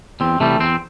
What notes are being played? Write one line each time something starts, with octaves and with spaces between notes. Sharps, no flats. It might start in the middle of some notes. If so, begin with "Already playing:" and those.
E2 C4
C3 E3 G3 A3
E2 C4